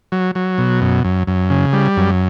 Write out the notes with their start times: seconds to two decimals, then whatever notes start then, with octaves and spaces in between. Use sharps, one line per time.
0.12 F#3
0.35 F#3
0.58 B2
0.82 F#2
1.04 F#2
1.27 F#2
1.50 C#3
1.73 G3
1.97 F#2